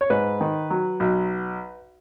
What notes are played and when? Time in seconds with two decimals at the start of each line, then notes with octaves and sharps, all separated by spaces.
0.01 C#5
0.10 G#2 B4
0.41 D#3
0.70 F#3
1.00 B1